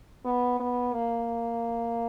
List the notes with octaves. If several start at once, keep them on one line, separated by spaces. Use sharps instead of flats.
B3
B3
A#3